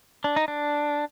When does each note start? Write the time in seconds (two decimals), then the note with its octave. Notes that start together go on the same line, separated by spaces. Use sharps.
0.24 D4
0.36 D#4
0.48 D4